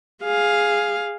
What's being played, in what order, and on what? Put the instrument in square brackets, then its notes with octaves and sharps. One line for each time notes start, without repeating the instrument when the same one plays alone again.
[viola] G#4 F5